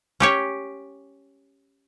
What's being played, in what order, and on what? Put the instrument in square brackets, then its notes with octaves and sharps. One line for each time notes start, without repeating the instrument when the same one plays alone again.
[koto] C#4 G4 C#5